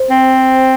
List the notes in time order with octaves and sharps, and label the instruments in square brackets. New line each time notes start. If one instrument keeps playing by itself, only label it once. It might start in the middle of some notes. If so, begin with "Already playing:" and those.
Already playing: [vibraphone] C5
[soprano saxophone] C4